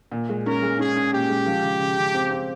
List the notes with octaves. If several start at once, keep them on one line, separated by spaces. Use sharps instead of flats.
A#2
G#3
C#4 A#4
G#3
C#4 G#4
C#4
A#2 G4
G#3
F3
C#3
C#3
C#3
C4
C4